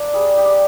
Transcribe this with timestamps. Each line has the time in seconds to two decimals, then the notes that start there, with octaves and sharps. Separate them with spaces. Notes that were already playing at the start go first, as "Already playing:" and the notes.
Already playing: A#3 D4
0.14 G3 G#4
0.38 G4
0.45 D4